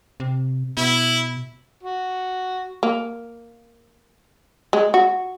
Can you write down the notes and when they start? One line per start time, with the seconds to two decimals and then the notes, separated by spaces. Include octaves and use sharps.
0.20 C3
0.77 B2 E4
1.83 F#4
2.83 A#3
4.73 G#3
4.94 F#4